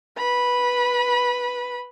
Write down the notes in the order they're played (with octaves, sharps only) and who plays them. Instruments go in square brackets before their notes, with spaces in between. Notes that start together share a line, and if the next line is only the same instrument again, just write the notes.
[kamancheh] B4 B5